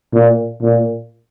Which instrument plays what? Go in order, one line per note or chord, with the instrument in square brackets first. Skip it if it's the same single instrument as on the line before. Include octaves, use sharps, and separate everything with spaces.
[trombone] A#2
A#2